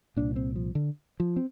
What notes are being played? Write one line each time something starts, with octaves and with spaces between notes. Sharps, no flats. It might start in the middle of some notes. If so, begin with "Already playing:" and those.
C2 A#2 D4
C4
F3
D3
F3
C4